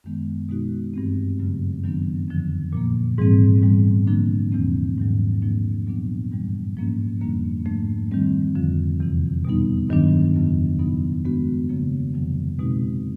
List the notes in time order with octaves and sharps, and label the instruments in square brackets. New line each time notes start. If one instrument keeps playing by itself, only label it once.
[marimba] F#2 D#3 G#3 B3
B2 G#3 B3 D#4 F#4
G2 E3 A3 C4
F#2 C#3 F#3 A3
F#2 D#3 F#3 B3 D4
F2 D3 F3
A#2 F3 A#3
G#2 E3 G3 C4
G#2 E3 G3 B3
D3 F3 A#3 D4
E2 C3 E3 A3 C4
G#2 D#3 F#3
G#2 F3 A#3 D4
A#2 F#3 B3 D4
G2 E3 G3
G#2 F3 A#3 C#4
F2 D3 G3 A#3 D4
G#2 F3 A3 D4
D#3 G3 C4
F2 D3 F3
E2 C3 E3
B2 G3 B3 D#4
G2 D#3 F#3 B3 D4
F2 C#3 F#3 B3
B2 F#3 B3 D#4
D#3 G#3 B3 D4 F#4
C#3 F3 A#3
F2 C3 D#3 F#3
B2 G#3 C4 D#4 F#4